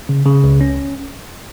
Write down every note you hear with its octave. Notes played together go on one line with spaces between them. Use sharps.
C#3
C#3
C#2
C#4